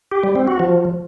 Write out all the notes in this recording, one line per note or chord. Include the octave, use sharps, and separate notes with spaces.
G4
G3
C4
F#4
F3